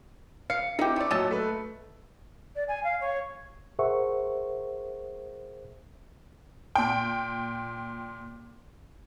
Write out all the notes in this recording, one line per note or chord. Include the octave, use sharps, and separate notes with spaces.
F5 C#7
C4 D#4 E4 G4
A3 D5
A#2 F#3 D#5 E5 A5
A3 B4
D5
G#5
F5
C#5
G#4 A#4 C5 E5 F#5 C#6
A#2 G5